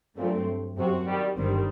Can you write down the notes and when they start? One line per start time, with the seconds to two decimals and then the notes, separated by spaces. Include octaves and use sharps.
0.17 G2 A#2 F#3 A3 C4
0.77 F#2 C3 F#3 C4 F#4
1.06 D#3 G3
1.36 G1 G2 D#3 G3 C4